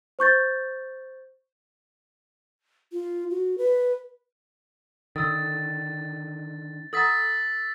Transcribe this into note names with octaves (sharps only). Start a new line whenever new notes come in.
C5 C#6 G6 A6
F4
F#4
B4
D3 D#3 A4 E6 A6
A4 F#5 A#5 E6 A6 B6